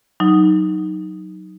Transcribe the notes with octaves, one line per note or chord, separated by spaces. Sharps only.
F#3 D#4